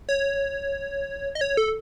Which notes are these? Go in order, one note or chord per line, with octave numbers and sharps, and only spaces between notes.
C#5
D#5
C#5
A4